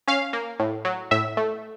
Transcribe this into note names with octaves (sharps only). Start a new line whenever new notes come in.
C#4 F5
A#3
A2
F#3
A2 E5
A3